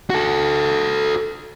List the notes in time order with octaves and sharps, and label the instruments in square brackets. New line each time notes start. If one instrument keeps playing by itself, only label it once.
[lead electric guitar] F#4 A4